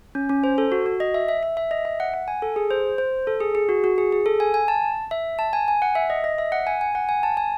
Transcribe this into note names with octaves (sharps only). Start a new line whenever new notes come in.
C#4
C#4
C5
A4
F#4
F#4
D#5
E5
E5
E5
E5
D#5
E5
F#5
F#5
G#5
A4
G#4
C5
C5
A4
G#4
G#4
F#4
F#4
G#4
G#4
A4
G#5
G#5
A5
E5
A5
G#5
G#5
F#5
E5
D#5
D#5
E5
F#5
G#5
G#5
F#5
G#5
A5
G#5